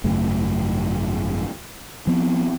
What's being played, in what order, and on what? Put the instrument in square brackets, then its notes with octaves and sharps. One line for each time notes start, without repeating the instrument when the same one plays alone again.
[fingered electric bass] G#1 F#2 C#3 A3
F3 B3 C4